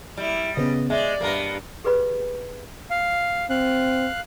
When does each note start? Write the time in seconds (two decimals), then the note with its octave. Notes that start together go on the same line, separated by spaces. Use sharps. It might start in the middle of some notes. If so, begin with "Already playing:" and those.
0.17 G3 E4
0.57 C#3 B3 D#5
0.90 G#3 D5 E5
1.21 G2 A#3 B3 A#4 B4
1.84 G4 G#4 B4 D5 B5
2.90 F5
3.50 C4 F5 F#6